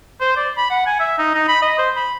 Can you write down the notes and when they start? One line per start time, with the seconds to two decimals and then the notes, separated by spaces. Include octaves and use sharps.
0.20 C5
0.36 D5
0.57 B5
0.70 F#5
0.86 G#5
1.00 E5
1.18 D#4
1.35 D#4
1.48 B5
1.62 D#5
1.78 C5
1.96 B5